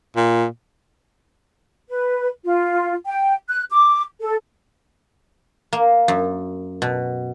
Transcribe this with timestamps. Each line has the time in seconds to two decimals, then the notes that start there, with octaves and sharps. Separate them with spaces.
0.16 A#2
1.89 B4
2.45 F4
3.07 G5
3.49 F#6
3.71 D6
4.21 A4
5.73 A#3
6.08 F#2
6.82 B2